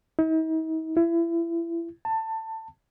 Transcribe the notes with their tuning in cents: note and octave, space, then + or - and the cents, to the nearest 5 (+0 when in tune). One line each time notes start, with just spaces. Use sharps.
D#4 +45
E4 +30
A5 +20